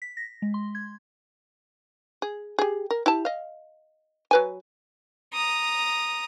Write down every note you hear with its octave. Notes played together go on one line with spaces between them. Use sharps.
B6
A#6
G#3
C6
G#6
G#4
G4 G#4
A#4
E4 G4 A5
D#5 F5
F#3 B4 G#5
A#5 D#6